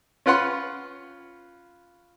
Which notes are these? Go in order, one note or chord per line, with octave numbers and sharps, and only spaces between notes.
C#4 F4 B4 F#5 C6